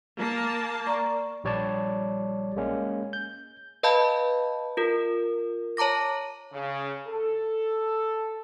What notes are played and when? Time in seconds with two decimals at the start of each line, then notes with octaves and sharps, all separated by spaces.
0.17 A#3 A5
0.87 D5 A#5 C#6
1.44 A#1 G3 C#5 D5 A5
2.56 G#3 A#3 C#4
3.13 G6
3.83 B4 D#5 F5 A5 B5 G6
4.77 F4 A#4
5.77 C#5 A5 A#5 D6 A#6
6.53 C#3
7.08 A4